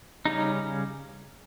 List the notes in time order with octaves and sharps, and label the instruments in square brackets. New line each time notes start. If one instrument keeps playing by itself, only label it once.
[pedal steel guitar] C#3 G3 C#4 D#4